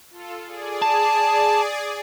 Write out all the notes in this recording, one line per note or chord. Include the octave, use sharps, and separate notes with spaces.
F4 A4
G#4 D5
A5